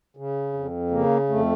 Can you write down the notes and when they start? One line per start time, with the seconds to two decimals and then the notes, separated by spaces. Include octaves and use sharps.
0.17 C#3
0.53 F2
0.91 C#3 A#3
1.29 F2 A3